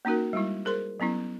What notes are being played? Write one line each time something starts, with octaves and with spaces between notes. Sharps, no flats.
A#3 C#4 D#4 F#4 A#4
G3 G#3 E4
G#4 A#4 C5 C6
F#3 B3 C#4 E4